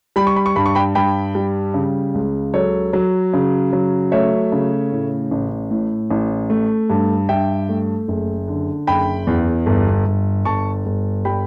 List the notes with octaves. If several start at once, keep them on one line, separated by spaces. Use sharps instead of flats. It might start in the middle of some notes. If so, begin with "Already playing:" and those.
G3 B5
C#6
B5
C#6
G2 B5
C#6
G5 B5
G2 G5 B5
G3
C#3
C#2
F#3 A4 C#5
F#3
C#3
F#3
A3 C#5 E5
C#3
A2
A1
A2
A1
A3
G2
G2 E5 G5
A3
F#1
D3
F#1 G5 B5
E2
G1
G1
G1 A5 C#6
G1
G3 G5 B5